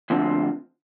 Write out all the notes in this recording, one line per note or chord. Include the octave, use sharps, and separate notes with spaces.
D2 D3 F3 C4